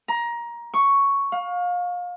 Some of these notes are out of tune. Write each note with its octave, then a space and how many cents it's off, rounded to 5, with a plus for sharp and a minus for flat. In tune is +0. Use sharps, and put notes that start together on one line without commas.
A#5 +20
C#6 +5
F5 +30